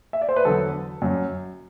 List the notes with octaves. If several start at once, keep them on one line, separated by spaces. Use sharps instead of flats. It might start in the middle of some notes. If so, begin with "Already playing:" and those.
E5
D5
C5
B4
E2 D3 F#3 A4
F#2 F#3